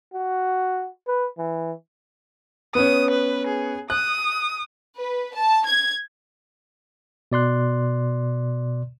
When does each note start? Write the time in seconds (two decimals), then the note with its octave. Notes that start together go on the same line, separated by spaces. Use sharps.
0.14 F#4
1.07 B4
1.38 E3
2.75 B3 C#4 D#6
3.11 B4
3.47 G#4
3.90 D#6 F#6
4.97 B4
5.35 A5
5.65 G#6
7.32 B2 D5 C6 F#6